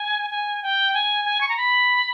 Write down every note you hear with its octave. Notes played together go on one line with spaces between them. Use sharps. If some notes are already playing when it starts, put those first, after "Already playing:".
Already playing: G#5
G#5
G5
G#5
G#5
C#6
A#5
B5